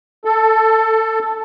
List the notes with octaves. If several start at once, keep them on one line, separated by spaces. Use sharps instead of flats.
A4